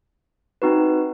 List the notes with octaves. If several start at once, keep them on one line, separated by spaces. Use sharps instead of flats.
C4 D#4 F#4 B4